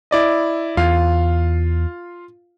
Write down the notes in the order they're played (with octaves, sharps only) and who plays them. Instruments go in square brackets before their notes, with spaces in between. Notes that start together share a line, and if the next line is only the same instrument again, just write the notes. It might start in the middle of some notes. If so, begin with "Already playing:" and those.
[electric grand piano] E4 D5 D#5
[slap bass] E2 [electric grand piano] F4 F5